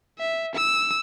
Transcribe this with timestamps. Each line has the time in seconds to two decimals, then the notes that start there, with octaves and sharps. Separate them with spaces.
0.18 E5
0.55 E6